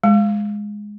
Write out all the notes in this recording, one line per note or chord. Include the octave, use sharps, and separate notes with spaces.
G#3